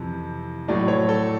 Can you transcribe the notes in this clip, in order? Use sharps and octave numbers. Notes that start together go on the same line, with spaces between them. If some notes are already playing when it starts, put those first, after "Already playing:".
Already playing: F2 C3 E3
A2 F#3 A3 D5
C#5
A4